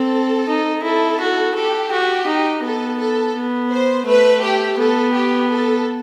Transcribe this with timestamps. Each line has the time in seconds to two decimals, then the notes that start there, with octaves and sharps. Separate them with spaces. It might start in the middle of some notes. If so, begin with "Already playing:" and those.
Already playing: C4 A4
0.48 D#4
0.83 E4 A4
1.20 F#4
1.55 G4 A4
1.92 F#4
2.26 D#4
2.63 B3 A4
2.98 A4
3.35 B3
3.70 C5
4.06 A3 B4
4.42 G4
4.77 B3 A4
5.13 G4
5.49 A4